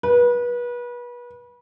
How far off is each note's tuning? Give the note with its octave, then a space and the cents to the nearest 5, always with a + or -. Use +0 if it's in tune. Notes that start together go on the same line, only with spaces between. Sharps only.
B4 -30